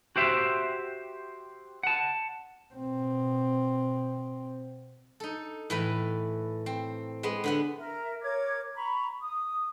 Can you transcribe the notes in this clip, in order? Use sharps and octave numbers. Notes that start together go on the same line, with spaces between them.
F#4 G4 C5 E5
F#5 A5
B2 C4
D#4 A4
A2 E3 B4
C4
G#3 B3
D3 B3 F#5
A#4 E5
A#4 C#5 D6 G#6
A#5 B5 C#6
D#6